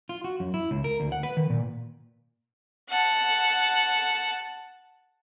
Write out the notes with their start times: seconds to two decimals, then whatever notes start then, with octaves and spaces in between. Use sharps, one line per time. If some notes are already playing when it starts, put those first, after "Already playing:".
0.09 F4
0.24 F#4
0.40 F#2
0.54 E4
0.71 C#2
0.84 A#4
1.00 D2
1.12 F#5
1.23 B4
1.37 D#3
1.50 A#2
2.89 F#5 A5